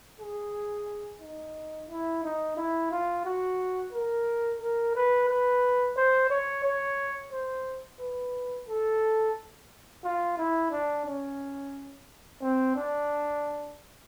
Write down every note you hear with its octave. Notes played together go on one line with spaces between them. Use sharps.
G#4
D#4
E4
D#4
E4
F4
F#4
A#4
A#4
B4
B4
C5
C#5
C#5
C5
B4
A4
F4
E4
D4
C#4
C4
D4